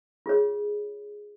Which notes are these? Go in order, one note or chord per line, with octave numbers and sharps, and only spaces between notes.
F4 G#4 C#5